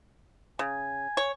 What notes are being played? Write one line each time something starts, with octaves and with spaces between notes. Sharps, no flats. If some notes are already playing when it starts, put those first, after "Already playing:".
C#3 G#5
C#5